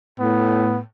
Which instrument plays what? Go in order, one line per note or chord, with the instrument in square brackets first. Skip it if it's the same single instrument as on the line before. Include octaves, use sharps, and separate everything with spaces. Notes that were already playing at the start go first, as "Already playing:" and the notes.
[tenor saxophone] A2 [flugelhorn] B3